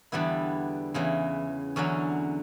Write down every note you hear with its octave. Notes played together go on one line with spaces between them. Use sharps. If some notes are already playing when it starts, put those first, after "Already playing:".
E2 D3 G3 B3 E4
E2 C#3 E3
E2 D3 F#3 C#4